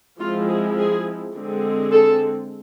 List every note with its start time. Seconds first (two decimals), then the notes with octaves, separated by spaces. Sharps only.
0.20 F3 G#3 C4 E4 F4
0.48 G#4
0.78 G#4
1.35 D3 G#3 C4
1.92 A4